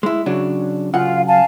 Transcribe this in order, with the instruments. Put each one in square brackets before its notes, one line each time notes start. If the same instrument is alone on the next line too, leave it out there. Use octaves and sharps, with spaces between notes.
[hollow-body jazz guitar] G#3 E4
C#3 F#3 D4
[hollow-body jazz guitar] F#2 C#3 F#5 [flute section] F4 F5
[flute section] F5 G#5 A5